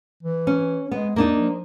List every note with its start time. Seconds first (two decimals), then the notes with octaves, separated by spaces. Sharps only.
0.23 E3
0.47 C#4
0.91 G#3 B3
1.16 E2 A#3 D4 D#4
1.34 F3